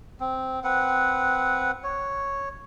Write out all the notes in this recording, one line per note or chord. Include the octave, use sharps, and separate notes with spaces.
C4
C4 B4 F#5
C#5